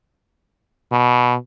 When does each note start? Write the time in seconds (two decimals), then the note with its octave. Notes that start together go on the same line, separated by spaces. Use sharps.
0.92 B2